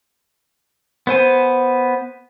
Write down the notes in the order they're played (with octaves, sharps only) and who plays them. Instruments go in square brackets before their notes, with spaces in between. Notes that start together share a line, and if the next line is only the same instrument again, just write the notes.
[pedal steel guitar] B3 C5 G#5